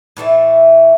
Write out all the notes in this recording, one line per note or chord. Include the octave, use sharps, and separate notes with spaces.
A2 E3 A3 E5